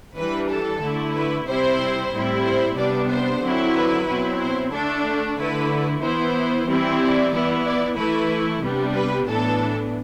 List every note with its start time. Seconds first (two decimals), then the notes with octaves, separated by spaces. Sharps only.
0.16 E3 G3 D4 B4
0.49 A4
0.81 D3 A3 E4
1.14 B4
1.47 C3 G3 C4 E4 C5
2.11 A2 G3 C4 E4
2.43 C5
2.76 C3 G3 B3 D4 D5
3.09 C5
3.42 D3 F#3 C4 E4
3.74 B4
4.06 B2 F#3 C4 E4
4.39 C5
4.72 D3 A3 D4 A4
5.37 D3 A3 E4 B4
6.01 E3 B3 E4 C5
6.67 E3 G3 C4 E4
6.99 D5
7.32 E3 B3 E4
7.65 D5
7.97 E3 A3 E4 B4
8.62 C3 G3 B3 D4
8.94 B4
9.27 A2 E3 B3 D4 A4